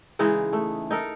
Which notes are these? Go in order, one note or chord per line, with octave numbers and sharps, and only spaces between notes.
C#3 E3 G#3 D#4
A3
D#4 A4 A#4